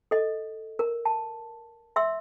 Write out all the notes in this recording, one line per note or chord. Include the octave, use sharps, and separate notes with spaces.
A4 D#5
A#4
A5
E5 C6 E6